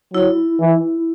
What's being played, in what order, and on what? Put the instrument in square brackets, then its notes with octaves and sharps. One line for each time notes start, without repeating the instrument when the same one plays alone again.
[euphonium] F#3 [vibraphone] E4
[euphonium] E3